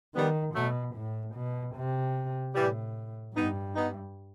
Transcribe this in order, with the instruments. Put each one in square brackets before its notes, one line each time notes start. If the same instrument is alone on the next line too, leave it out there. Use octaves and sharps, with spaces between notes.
[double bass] D#3 [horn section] G3 B3
[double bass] B2 [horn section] F#3 A3
[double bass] A2
B2
C3
[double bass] A2 [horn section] E3 G3
[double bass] G2 [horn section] B3 D#4
[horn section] B3 D#4